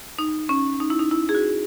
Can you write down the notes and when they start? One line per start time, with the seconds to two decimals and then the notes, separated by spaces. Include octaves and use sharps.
0.19 D#4
0.49 C#4
0.80 D#4
0.90 E4
0.99 D#4
1.11 E4
1.29 G#4
1.35 F#4